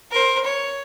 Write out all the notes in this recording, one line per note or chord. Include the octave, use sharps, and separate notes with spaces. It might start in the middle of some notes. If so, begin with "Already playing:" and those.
A#4 C5
C#5